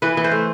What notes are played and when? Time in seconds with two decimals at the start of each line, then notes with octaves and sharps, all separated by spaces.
0.02 E3 B4
0.17 E3
0.24 C5
0.32 A3